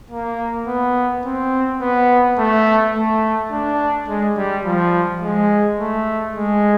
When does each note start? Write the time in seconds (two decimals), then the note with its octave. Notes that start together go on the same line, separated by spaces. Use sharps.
0.10 A#3
0.67 B3
1.25 C4
1.81 B3
2.38 A3
2.95 A3
3.52 D4
4.08 G#3
4.37 G3
4.65 F3
5.22 G#3
5.79 A3
6.36 G#3